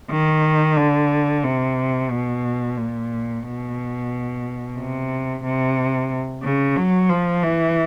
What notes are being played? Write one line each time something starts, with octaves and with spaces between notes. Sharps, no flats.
D#3
D3
C3
B2
A#2
B2
C3
C3
C#3
F#3
F3
E3